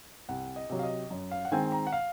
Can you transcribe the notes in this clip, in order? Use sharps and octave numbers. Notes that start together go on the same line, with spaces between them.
C2 F#5
D#5
C3 F#3
F5
D#5
F#2
F5
F#5
D#3 G#3 C4 G#5
A#5
F#5
F5